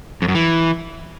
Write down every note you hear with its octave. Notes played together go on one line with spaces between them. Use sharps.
F2
F#2
E3